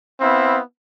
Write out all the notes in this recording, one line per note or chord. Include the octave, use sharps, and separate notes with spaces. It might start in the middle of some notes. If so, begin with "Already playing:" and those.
B3 C4 E4 F5